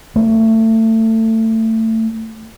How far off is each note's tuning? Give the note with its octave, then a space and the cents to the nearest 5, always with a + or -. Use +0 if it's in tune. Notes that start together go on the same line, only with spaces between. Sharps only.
A3 +25